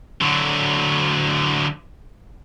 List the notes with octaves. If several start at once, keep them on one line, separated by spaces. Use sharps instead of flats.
D3 F#3